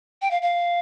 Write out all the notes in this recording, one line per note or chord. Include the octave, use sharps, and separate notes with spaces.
G5
F5
F5